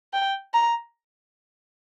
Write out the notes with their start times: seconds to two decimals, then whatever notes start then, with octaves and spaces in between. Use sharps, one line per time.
0.14 G5
0.54 A#5